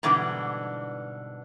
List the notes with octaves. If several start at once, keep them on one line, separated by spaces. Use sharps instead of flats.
G#2 B2 D3 E3 G3